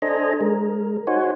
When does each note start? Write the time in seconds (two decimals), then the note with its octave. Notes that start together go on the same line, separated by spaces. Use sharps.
0.02 D4 A4 C5 D#5 G#5 A#5
0.41 G#3 A#4
1.07 D#4 F#4 C5 C#5 F#5 G#5